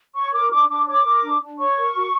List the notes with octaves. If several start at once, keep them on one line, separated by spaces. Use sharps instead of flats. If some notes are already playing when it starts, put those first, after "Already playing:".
C#5 C#6
A#4 D6
D4 D6
D4 D6
C#5 D6
A#4
D4
D4
C#5 C#6
A#4
F#4